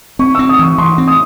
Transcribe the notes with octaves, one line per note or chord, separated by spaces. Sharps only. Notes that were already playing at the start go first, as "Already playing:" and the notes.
C4 C#6
C4 E6
D#6
E3 C#6
E3 C6
C4
D#6